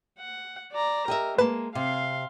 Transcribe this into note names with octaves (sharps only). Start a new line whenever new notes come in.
F#5
D5 A#5
G4 A#4 D#5 E5
G#3 A#3 B4 A5
C3 F5 C6